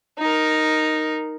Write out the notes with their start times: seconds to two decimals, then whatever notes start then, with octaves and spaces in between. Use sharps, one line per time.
0.19 D#4 A#4